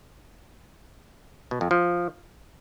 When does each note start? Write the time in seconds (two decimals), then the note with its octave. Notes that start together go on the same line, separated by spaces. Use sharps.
1.51 B2
1.61 F2
1.71 F3